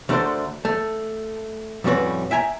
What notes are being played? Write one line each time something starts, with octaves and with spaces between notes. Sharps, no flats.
D2 A3 D4 F#4 A#4 C5
A3
F2 A2 G3 C#4 F#4 B4
E5 G5 G#5 A#5